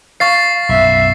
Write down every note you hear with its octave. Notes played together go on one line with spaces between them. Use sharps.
F5 C#6 A6 C7
B1 F#2 E5